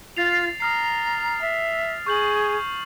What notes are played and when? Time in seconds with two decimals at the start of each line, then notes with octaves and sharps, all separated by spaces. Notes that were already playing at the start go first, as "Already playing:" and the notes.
0.17 F4 A6 C7 F7
0.60 A#5 D#6 F6 C7
1.41 E5
2.06 G#4 C#6 G6 F#7